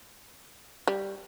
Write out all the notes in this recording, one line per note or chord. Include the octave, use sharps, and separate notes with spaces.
G3